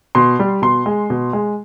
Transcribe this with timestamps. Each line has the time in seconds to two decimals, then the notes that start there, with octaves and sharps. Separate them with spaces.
0.15 B2 C6
0.39 G3
0.62 B2 C6
0.86 G#3
1.10 B2
1.33 G#3